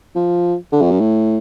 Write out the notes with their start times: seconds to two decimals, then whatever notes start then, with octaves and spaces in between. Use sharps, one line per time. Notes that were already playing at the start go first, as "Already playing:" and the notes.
0.15 F3
0.73 D3
0.81 F2
0.91 F#2
1.00 A2